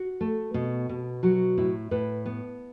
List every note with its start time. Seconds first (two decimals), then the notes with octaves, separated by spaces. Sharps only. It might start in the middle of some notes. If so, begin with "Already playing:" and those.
Already playing: F#4
0.21 A3
0.54 B2
0.89 B2
1.23 F#3 F#4
1.58 A2 E4
1.91 A2 B4
2.26 B3